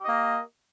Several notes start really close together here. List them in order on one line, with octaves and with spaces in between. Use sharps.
G4 D#5 A#3